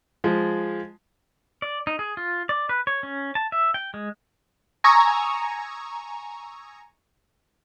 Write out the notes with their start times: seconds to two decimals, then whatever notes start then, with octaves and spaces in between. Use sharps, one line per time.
0.24 F3 G#3
1.62 D5
1.87 D#4
1.99 G#4
2.17 F4
2.49 D5
2.69 B4
2.87 C#5
3.03 C#4
3.35 A5
3.52 E5
3.74 G5
3.94 G#3
4.84 G#5 A#5 C#6 D#6 E6 G#6